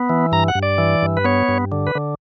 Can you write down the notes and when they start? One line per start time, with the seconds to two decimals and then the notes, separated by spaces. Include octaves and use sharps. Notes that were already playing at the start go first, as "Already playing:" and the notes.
Already playing: B3
0.09 E3
0.32 G2 A#5
0.48 F#5
0.55 G2
0.63 D5
0.78 E3
1.02 G2
1.17 B4
1.24 B3 C#5
1.48 G2
1.72 D3
1.87 B4
1.95 D3